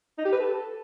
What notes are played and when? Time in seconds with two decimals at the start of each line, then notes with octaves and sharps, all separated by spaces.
0.18 D#4
0.25 G4
0.32 B4
0.39 A4